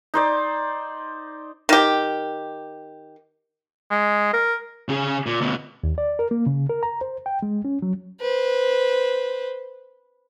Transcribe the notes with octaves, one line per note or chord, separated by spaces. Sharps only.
D#4 C5 D5
D#3 G4
G#3
A#4
C#3 G#4
A#2
D2 B2
D#2
D5
A#4
A#3
C#3
A#4
A#5
C5
G5
G#3
C#4
F#3
B4 C5